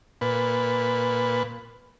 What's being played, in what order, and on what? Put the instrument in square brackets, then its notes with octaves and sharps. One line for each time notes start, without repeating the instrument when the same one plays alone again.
[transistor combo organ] A#2 B4